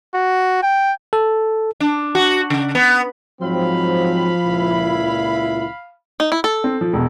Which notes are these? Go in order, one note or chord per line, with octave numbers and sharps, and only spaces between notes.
F#4
G5
A4
D4
F#4
C#3
B3
G#2 F3 F#3 C4 F5 B5
C#2 A#2 E4
D#4
E4
A4
C4
F3
E1 B2